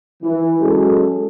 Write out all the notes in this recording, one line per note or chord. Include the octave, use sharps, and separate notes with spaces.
E3
F#3 G#3 C#4 G#4 A4